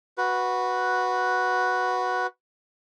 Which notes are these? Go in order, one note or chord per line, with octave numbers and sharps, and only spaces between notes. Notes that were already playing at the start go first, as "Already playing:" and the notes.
F#4 B4